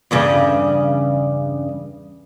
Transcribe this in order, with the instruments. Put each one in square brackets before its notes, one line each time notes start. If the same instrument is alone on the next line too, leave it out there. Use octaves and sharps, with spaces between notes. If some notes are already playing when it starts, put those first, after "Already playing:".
[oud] E2 G2 C#3